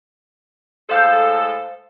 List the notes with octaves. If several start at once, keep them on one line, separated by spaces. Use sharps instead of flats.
A2 G#3 A4 C5 F5 G6